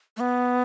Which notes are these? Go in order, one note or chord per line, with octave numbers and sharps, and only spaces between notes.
A3
B3